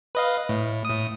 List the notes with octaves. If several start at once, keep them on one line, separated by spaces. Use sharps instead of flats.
B4 D#5 F5
A2
A2 D#6